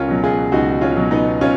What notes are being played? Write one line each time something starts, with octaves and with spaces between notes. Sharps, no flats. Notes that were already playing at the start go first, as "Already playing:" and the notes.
Already playing: C#2 C#4 F4 A#4
B2 F#3
F4 G#4
C#2 D#4 F#4
C#4 F4
B2 F#3
B3 D#4
C#4 F4